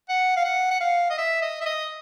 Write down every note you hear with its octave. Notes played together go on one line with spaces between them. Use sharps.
F#5
F5
F#5
F#5
F5
D#5
E5
D#5
E5
D#5